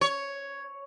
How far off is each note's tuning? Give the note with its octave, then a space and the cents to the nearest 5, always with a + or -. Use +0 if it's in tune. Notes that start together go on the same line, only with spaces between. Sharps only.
C#5 +5